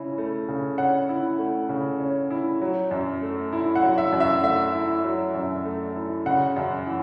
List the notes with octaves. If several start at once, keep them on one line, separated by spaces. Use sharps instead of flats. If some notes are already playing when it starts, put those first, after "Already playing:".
Already playing: C#3 C#4 E4
A3
C#3
C#4 F#5
E4
A3
C#3
C#4
E4
F#3
F#2
A3
E4
F#5
F#3
E5
F#2
E5
A3 E5
E4
F#3
F#2
A3
E4
C#3 F#5
F#2
E3